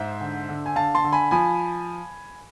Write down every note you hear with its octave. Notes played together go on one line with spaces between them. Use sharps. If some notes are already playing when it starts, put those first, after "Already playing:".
Already playing: G#2 C5 E5
D3
D3
G#5
D3 F5 A5
A5 C6
D3
G#5 B5
F3 G#5 B5